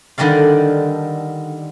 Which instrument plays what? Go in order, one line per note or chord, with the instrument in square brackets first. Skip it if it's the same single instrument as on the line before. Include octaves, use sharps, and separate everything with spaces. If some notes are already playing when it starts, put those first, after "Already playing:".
[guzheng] D3 D#3 G3 D5 F5